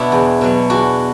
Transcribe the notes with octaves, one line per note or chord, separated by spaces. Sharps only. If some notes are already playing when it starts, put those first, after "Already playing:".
Already playing: B2 B3 D4 E4 F#4
E2
B2 F#3
E2 D4 F#4